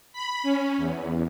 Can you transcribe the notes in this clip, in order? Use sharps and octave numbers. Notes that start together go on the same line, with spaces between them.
B5
C#4
E2